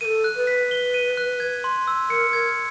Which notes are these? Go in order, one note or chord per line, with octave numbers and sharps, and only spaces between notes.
A4 A#4 D#7
F#6
B4
B6
G7
D#7
F#6
G#6
C6
E6
A#4 C#7
A#4 G#6